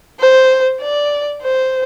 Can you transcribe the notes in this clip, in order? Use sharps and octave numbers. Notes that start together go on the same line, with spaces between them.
C5
D5
C5